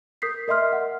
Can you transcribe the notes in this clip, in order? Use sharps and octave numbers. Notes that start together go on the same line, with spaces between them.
A#4 D#6 G6 B6 C7
A#4 D#5 E5 C6 F6
F#5